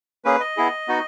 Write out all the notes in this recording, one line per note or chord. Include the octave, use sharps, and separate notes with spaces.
A#3 C#4 G#4 B4
D#5
B3 E4 G#4
B3 D#4 F#4